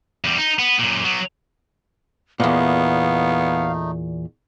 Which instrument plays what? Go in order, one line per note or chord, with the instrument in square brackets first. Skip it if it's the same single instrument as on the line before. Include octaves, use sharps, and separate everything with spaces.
[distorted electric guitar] E2 G3
D#4
B3
F#2 A#2
F#3 B3
[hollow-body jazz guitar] E2 A#2 [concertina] A3 D#4 [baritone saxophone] B3 [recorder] F5